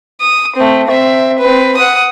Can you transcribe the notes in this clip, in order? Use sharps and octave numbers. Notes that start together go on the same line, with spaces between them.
D#6
A3 C4
C4 E5
C4 B4
F#5 D#6